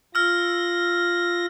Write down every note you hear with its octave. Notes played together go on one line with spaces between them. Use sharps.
F4 E6 F6 A#6